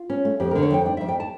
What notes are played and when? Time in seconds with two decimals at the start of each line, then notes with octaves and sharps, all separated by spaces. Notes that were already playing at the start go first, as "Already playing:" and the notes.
Already playing: F4
0.10 C#4
0.25 A3
0.40 F2 G4
0.51 D3 A#4
0.63 C#5
0.71 F2 G5
0.85 D4 G5
0.97 F2 E5
1.08 G5
1.20 A5